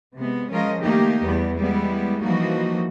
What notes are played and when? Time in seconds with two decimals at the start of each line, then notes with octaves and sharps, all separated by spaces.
0.15 C3 G#3 B3
0.51 F3 G#3 C#4 F4 A#4 D#5
0.81 D#3 A3 A#3 D#4 G4
1.24 E2 G3 B3
1.58 G3 G#3 B3 E4
2.21 E3 F3 G3 A#3 D#4 F#4